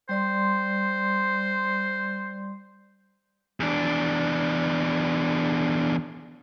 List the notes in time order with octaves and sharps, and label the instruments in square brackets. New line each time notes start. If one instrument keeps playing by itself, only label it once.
[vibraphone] G3 D5 C6 [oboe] C5
[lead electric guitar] E2 D4